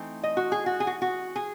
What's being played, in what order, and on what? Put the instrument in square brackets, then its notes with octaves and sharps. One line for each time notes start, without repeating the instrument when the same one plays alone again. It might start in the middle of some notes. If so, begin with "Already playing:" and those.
Already playing: [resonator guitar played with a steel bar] E3 A3 C4 D#4
D#5
F#4
G#4
F#4
G#4
F#4
F#4
G#4